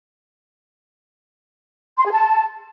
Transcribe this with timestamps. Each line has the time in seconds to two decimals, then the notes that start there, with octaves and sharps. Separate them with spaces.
1.97 C6
2.04 G#4
2.11 A5